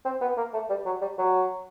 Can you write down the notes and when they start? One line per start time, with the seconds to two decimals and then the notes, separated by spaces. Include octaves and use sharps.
0.05 C4
0.21 B3
0.37 A#3
0.53 A3
0.70 G3
0.86 F#3
1.01 G3
1.18 F#3